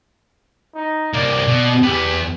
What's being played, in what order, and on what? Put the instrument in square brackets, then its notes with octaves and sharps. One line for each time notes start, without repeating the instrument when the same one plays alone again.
[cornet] D#4
[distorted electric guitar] C2 A#3 [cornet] D5
[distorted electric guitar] B2
[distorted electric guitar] E2 B3 [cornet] G4